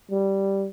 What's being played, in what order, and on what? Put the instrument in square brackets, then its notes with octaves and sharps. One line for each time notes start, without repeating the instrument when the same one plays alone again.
[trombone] G3